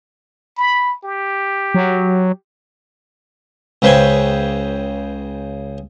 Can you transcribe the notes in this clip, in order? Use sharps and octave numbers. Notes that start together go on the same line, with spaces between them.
B5
G4
F#3
C#2 C#3 B4 C5 G5 G#5